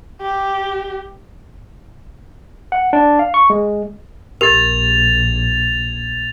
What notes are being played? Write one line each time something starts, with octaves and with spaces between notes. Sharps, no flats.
G4
F#5
D4
F5
C#6
G#3
A#1 G4 A#4 G#6 A6 F7